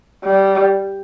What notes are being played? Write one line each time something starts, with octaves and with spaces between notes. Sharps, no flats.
G3